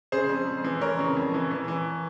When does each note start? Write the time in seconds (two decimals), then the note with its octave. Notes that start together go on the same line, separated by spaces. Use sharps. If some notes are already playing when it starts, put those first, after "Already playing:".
0.12 C#3 G#4 C5
0.29 F2
0.47 F2
0.64 E3
0.81 F2 A#4 C#5
0.98 C#3
1.17 F2
1.34 E3
1.51 E3
1.68 E3